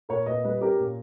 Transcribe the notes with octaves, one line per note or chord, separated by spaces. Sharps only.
A#2 A#4 C#5
A#2 B4 D#5
G3 B4 D#5
C#4 G4 A#4
A#2